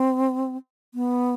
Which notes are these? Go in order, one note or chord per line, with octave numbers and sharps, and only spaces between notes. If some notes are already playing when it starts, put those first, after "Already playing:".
Already playing: C4
B3